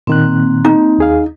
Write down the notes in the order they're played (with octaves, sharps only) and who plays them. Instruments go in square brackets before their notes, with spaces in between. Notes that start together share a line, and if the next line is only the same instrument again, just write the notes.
[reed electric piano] A#2 D#3 F#6 [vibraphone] A#3 C4
[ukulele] D#4
[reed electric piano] D#2 G#4 F5